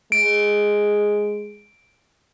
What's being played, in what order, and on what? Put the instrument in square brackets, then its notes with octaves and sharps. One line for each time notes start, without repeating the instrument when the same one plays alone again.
[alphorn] G#3 [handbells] D7